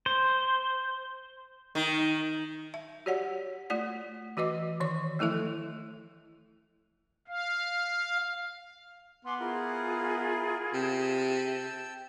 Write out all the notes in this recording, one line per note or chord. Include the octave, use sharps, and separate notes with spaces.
C5
D#3
E5
F#4 G4 C#5 D5 F#5
A3 F4 D5 F#5
E3 F#4 B4 D#5 D6
D#3 E3 C#5 C#6
F3 A3 E4 A4 E5
F5
B3 G#5 C6 D6
E4 F4 G#4 A#4
C3 G5 A5 E6